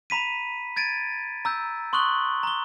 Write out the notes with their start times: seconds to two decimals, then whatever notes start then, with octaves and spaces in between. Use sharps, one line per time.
0.10 A#5 B5 B6 D#7
0.76 G#6 A6 D7 D#7
1.45 A#5 E6 G6
1.93 C6 C#6 D#6 F#6 F#7 G7
2.43 A#5 G7